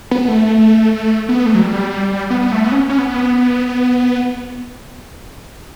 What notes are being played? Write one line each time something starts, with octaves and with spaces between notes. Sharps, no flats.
B3
A3
B3
A3
F#3
G3
B3
B3
A3
B3
C#4
C#4
B3